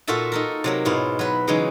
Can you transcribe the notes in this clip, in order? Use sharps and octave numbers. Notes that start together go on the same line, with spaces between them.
A#2 F4 F#4 A4 E5 A5
D#4 A4 A#4
C3 F#3 A#3
G#2 B2 E4 F4
F#3 B4
C#3 E3 F#3 G#3 D#4